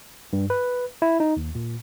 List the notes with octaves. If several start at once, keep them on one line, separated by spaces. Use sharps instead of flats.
G2
B4
E4
D#4
D#2
A#2